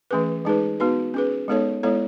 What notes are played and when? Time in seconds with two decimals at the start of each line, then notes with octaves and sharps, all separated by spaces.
0.11 E3 A3 C#4 G#4 B4
0.45 G#3 D#4 G#4 B4
0.80 B3 D#4 F#4 B4
1.14 C#4 G#4 B4
1.48 G#3 B3 D#4 A4 C#5
1.83 G#3 B3 E4 A4 C#5